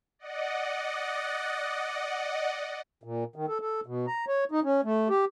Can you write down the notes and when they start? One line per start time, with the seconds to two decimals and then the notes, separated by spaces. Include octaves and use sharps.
0.19 D5 D#5 F#5
3.04 A#2
3.36 D#3
3.49 A4
3.61 A4
3.86 B2
4.07 A#5
4.28 C#5
4.51 D#4
4.64 C#4
4.84 A3
5.09 G4